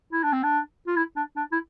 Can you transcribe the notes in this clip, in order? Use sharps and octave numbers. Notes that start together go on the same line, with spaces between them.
E4
D4
C4
D4
F4
E4
D4
D4
E4